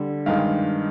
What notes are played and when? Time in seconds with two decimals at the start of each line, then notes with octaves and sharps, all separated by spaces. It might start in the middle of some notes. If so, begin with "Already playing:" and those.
Already playing: D3 G3
0.26 G2 D#3 G#3 F5